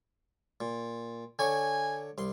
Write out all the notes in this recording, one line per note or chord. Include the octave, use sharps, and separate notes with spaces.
A#2
D3 C#5 G#5 C#6
C2 C6